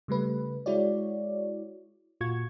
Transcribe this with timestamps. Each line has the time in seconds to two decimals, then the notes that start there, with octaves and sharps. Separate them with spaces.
0.08 C#3 G3 A3 B4
0.66 G#3 E4 F#4 C#5 D5
2.21 A#2 F4 F#4 C#6 G#6